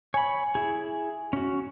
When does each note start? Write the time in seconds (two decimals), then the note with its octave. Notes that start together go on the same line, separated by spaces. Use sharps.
0.14 C#5 G#5 B5
0.55 E4 G#4
1.33 C#4 F#4